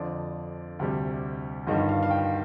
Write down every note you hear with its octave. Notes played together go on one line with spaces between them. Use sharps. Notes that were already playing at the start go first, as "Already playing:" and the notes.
Already playing: F2 D3 F3 D5
D2 C3 G3
G1 G2 D#3 G3 D#5
F5
F5
G5